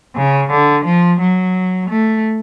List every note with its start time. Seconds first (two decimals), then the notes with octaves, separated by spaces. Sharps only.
0.16 C#3
0.50 D3
0.85 F3
1.20 F#3
1.89 A3